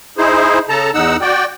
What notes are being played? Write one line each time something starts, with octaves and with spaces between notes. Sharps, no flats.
D#4 E4 G#4 C5
C#3 A4 A5 A#5
E2 D#4 F#5 E6
F#4 D5 G5